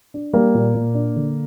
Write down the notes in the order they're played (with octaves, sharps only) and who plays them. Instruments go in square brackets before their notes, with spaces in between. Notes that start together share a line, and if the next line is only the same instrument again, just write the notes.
[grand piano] D4
[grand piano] G3 [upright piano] A#3
[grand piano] A#2
A#2
D4
D3